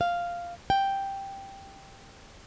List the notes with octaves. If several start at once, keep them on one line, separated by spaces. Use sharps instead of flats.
F5
G5